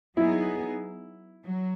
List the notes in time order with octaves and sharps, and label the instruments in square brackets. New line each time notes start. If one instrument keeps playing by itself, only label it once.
[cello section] F#3 B3 D#4 G#4 [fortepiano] E4
[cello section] F#3